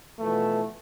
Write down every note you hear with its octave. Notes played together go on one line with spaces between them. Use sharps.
B2 E3 F3 A3